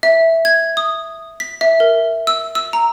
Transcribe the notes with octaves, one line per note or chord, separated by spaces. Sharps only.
E5
G#6
D#6
B6
E5
A#4
E6
E6
A#5